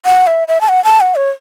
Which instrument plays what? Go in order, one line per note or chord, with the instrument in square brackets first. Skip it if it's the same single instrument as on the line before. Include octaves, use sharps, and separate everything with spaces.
[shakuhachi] F#5
E5
E5
A5
F#5
A5
F#5
C#5